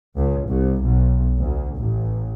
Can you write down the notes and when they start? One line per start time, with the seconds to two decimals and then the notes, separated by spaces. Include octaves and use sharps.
0.16 C#2
0.48 C2
0.83 B1
1.39 D2
1.77 A1